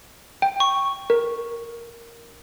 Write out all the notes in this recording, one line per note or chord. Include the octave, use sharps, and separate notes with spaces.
G5
C#6
A#4